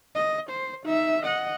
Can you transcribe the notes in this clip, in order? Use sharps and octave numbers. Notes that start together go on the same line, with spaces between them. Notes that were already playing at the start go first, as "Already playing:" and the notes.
D#5
C5
D#4 E5
D#5 F#5